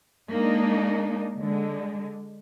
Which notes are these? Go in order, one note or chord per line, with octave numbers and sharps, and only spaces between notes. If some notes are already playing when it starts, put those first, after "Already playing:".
G#3 A#3 D4 D#4
D3 G#3